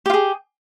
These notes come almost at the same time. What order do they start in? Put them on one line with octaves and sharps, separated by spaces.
G4 F4 G#4